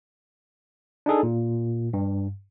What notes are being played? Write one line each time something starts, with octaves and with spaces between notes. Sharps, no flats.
D4 D#4 G#4 A4
A#2
G2